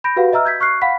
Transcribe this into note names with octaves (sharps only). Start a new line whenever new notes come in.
B5 G6 A#6 D7
F#4 G4 B4 F5 F#5
D#5 E5 A#5 E6 F6
G6 G#6 B6
C#6 F6 F#6 C7
F5 F#5 B5 B6